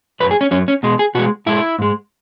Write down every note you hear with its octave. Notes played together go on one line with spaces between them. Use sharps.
F#2 F#3 B4
G#4
C#4
F#2 F#3 C#4
C#4
B2 G#3
G#4
B2 G#3 F#4
G#2 G#3 E4
G#2 G#3